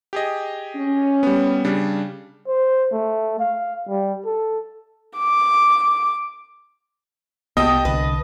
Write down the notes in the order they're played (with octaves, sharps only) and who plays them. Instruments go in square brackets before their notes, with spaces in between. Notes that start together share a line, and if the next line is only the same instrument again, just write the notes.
[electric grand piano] G4 G#4 D#5
[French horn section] C#4
[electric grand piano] G3 B3
C#3 G3 D4
[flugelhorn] C5
A3
F5
G3
A4
[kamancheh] D6
[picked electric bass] C2 B3 [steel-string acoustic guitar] G4 G5 [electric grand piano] D#5 A5 [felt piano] D#6
[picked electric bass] C2 D3 [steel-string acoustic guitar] B4